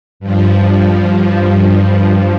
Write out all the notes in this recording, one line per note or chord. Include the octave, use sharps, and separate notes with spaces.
G2 F3